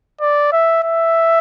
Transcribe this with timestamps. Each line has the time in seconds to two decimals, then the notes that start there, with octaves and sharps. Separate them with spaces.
0.21 D5
0.52 E5
0.83 E5